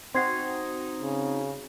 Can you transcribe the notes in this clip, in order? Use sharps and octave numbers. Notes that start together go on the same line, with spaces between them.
C4 D#4 F#4 C6 G#6 C7
C#3